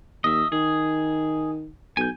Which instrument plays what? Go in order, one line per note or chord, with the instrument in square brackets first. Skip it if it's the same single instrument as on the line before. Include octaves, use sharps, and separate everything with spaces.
[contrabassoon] D#2 [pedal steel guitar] D#5 E5
[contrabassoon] D#3 [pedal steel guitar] G#4
[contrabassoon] B1 [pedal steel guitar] G#5 G6